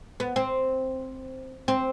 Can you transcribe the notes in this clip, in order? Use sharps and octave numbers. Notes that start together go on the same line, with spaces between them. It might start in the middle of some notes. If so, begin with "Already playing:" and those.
B3
C4
C4